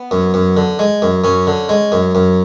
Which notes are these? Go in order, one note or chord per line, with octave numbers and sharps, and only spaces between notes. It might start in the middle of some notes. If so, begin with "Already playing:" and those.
Already playing: B3
F#2
F#2
D3
G#3
F#2
F#2 C#4
D3
G#3
F#2
F#2